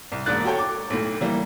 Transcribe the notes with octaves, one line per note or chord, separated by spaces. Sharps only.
C2
E1 G#2 A#3 D5 F#6 A6
F#4 G4 A4 C#5 G5
D6
B1 A2
E3 G3 A#3